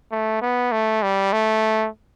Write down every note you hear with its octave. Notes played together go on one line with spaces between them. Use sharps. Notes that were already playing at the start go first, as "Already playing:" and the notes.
A3
B3
A3
G3
A3